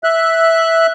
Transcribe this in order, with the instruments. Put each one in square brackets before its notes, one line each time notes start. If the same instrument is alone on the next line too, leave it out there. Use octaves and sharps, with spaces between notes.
[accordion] E5 F#6